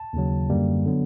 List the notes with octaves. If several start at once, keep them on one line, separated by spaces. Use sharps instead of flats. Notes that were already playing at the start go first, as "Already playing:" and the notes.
Already playing: A5
D#2 C#3 F#3
F#2 D3 G3 A#3
D3 F#3 B3